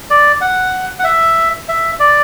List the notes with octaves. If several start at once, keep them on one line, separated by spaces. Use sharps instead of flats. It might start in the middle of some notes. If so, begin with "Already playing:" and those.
D5
F#5
F#5
E5
E5
D5